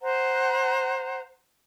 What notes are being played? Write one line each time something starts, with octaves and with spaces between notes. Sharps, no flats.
C5 F#5 A#5